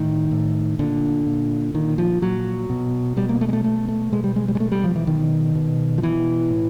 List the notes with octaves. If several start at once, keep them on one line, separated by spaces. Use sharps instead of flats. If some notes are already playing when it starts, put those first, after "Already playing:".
Already playing: A2 D#3
A2
A#2 D3
A#2
A#2 D#3
F3
A#2 F#3
B2
B2 G3
A#3
A3
G#3
A3
B2 A3
A3
B2 G#3
G3
G#3
G3
G#3
B2 A3
G3
F3
E3
B2 D#3
B2
F3
B2 E3
A2